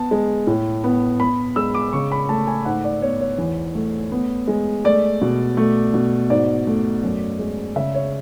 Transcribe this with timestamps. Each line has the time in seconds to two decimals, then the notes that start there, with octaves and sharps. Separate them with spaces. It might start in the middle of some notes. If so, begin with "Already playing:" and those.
Already playing: B3 A5
0.11 G#3
0.47 A2
0.84 B3
1.20 B3 B5
1.56 G#3 E6
1.74 D6
1.93 C#3 C#6
2.12 B5
2.29 A3 A5
2.47 G#5
2.65 G#2 F#5
2.84 D5
3.02 B3 C#5
3.21 C#5
3.38 E2
3.75 A3
4.12 B3
4.48 G#3
4.84 A3 D5
5.21 B2
5.57 A3
5.94 B2
6.30 G#2 D5
6.67 A3
7.03 F#2
7.39 G#3
7.76 C#3 E5
7.95 C#5